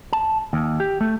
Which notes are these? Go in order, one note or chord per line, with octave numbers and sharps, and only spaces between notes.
A5
D#2
G4
A3